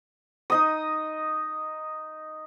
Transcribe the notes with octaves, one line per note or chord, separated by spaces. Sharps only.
D#4 D#5 D#6